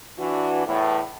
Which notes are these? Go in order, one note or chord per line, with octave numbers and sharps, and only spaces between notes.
E3 D4 F#4
E2 A2